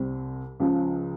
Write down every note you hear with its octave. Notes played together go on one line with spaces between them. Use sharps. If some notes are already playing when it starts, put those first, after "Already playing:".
Already playing: C2 C3 G3 C4
C#2 C#3 F3